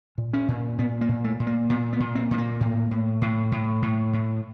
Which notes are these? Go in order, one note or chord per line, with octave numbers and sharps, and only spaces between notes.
A#2
C#4
A#2
A#2 B3
A#3
A#2
A3
A#2
A#3
A#2 B3
B3
A#2
C4
A#2 B3
A#3
A2
A2
A2
A2
A2
A2